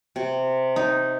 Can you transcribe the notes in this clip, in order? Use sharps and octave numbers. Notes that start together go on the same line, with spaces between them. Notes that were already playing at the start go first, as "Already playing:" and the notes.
C3
D#4